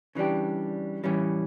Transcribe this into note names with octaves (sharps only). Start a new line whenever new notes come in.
C#3 E3 G3 D4 G4
A2 E3 G3 C#4